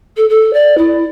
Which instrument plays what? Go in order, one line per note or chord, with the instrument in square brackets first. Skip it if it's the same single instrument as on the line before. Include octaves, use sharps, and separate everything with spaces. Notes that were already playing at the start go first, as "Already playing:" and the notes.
[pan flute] A4
A4
D5
E4